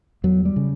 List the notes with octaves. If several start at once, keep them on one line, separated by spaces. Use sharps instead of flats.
E2 F#3
G3
C#3